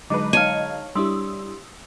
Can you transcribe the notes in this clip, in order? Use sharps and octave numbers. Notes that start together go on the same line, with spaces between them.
D3 F#3 G#3 D#4 B4 A5 D6
D#4 C#5 D#5 F5 G#5 A5 F6
G3 D4 E4 G4 C6 D#6 E6